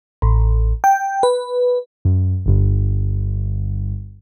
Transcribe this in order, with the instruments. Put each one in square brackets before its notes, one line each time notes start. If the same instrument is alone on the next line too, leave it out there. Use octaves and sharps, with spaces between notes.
[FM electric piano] A1
G5
B4
[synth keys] F#2
G1 G2